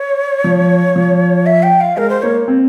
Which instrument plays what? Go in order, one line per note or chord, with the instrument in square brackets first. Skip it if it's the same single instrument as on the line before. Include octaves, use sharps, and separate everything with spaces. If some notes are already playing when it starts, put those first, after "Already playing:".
Already playing: [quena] C#5
[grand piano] F3
F3
[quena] E5
G5
F5
[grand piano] G#3 [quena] A#4
[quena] C5
[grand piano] A#3 [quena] C#5
[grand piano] C4